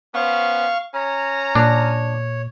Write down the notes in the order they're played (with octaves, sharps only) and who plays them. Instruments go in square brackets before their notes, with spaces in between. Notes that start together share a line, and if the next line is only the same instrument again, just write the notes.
[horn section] B3 C#4 C5 [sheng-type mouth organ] F5 C#6
[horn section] C#4 A#5 [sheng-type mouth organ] C#5
[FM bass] A#2 [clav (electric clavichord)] D4